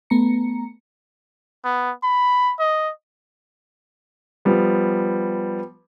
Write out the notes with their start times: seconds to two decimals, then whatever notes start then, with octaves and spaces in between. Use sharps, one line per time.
0.10 A3 B3 A#5 C#7
1.64 B3
2.03 B5
2.59 D#5
4.45 F3 G3 B3